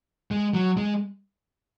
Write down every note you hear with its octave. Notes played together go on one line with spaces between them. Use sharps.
G#3
F#3
G#3